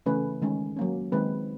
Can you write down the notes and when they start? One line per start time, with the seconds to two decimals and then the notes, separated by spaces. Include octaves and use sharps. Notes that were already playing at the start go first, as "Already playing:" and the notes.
0.06 C#3 E3 A3 C#4 B4
0.42 D#3 G#3 C#4
0.77 F#3 A#3 C#4
1.12 D#3 G#3 C4 B4